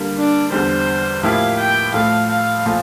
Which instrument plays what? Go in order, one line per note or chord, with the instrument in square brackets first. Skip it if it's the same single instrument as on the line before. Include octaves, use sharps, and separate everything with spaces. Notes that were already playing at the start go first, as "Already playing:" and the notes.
Already playing: [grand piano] D3 G3 A#3
[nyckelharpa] D4
[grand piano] E2 D3 G3 [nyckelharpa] C5
[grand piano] A2 F3 A#3 E4 G4 [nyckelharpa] F5
[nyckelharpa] G5
[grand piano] A2 F3 A3 [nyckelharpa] F5
[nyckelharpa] F5
[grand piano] A#2 F3 A3